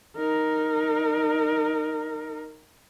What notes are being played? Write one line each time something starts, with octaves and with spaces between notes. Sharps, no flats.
D#4 A#4